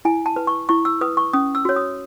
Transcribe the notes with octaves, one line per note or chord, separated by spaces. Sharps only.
E4 G#5
A5
B4
C#6
E4 C#6
E6
B4 D#6
C#6
C#4 D#6
E6
F#4 C#5
D#6